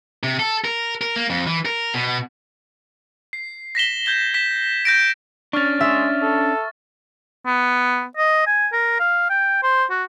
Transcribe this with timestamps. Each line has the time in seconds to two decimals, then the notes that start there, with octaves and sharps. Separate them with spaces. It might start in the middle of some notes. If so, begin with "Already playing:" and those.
0.23 C3
0.39 A4
0.65 A#4
1.01 A#4
1.16 A#3
1.30 F2
1.47 E3
1.65 A#4
1.94 B2
3.33 C7
3.75 A#6 B6 E7 G7
4.06 G6 G#6 G7
4.34 B6 E7
4.85 G6 A#6 D7
5.53 C#4 D4 C#6 F6 A6
5.81 G#3 E5
6.23 A4
7.46 B3
8.17 D#5
8.47 G#5
8.73 A#4
9.00 F5
9.30 G5
9.63 C5
9.90 F#4